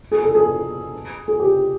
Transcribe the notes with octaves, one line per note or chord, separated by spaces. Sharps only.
G#4
A4
G#4
G#4
G4